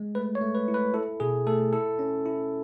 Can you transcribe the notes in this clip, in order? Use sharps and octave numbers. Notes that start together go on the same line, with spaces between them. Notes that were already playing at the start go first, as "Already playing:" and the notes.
Already playing: G#3
A3 B4
C#5
A3
B4
E4
B4
E4 A4
B2 G#4
A3 A4
E4 A4
C#4
E4